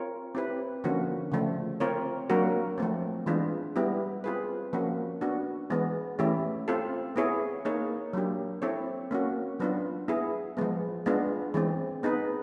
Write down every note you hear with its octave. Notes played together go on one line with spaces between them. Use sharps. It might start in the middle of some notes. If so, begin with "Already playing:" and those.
Already playing: C4 F4 A#4 C#5
C4 E4 G4 B4
D3 F3 A#3 C#4 F#4
C#3 F3 A3
C4 F4 A#4 C#5
F#3 A#3 D4 F#4 A#4
F3 A3 C4
E3 G#3 B3 D4 F4
G3 B3 E4 G4
C4 F4 G#4 B4
F3 A#3 C#4 F#4
B3 D4 F#4
E3 G#3 B3
E3 A3 C#4 E4 G4
C4 F4 A4
B3 E4 G#4 C#5
A#3 D#4 G#4 C#5
F#3 A#3 D4 G4
C4 E4 A4 C#5
A#3 C#4 F#4
F#3 B3 D4 F4
B3 E4 G#4
F3 G#3 B3
G#3 B3 D4 F4
E3 G#3 C4
B3 D#4 G#4 B4